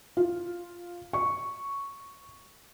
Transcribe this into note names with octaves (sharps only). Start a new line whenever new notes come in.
F4
C#6